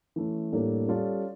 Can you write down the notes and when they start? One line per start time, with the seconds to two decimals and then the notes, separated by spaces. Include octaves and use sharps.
0.16 E3 A3 C#4
0.52 A2 G3 A#3 D4 A4
0.88 G3 C#4 F4 A4 D5